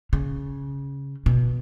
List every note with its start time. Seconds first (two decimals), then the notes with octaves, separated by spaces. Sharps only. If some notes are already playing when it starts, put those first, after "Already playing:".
0.13 C#3
1.26 B2